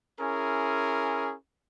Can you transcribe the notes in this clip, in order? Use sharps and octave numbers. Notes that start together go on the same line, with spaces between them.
C#4 E4 G#4 A#4